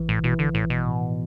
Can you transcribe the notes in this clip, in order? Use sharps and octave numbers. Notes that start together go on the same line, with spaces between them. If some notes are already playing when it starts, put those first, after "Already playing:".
Already playing: A1 E3
A2
B2 E3
D3
A2 E3
B2
A2